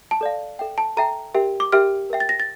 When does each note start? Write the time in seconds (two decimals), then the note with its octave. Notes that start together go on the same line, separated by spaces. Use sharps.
0.11 A5
0.21 A4 D5 F5
0.59 A4 E5 G5
0.78 A5
0.97 A4 E5 G5 A#5
1.35 G4 A#4 E5 G5
1.60 D6
1.72 G4 A#4 E5 G5 F6
2.10 A#4 E5 G5
2.20 A6
2.29 A#6
2.40 A6